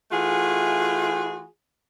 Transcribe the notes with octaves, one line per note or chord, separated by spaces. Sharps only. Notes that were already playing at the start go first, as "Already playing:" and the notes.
E3 A3 F4 F#4 G#4